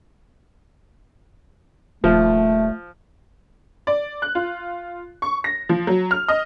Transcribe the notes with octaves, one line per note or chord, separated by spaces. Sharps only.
D#1 F3 A3
D5
F#6
F4
C#6
A#6
F3
F#3
F6
D#5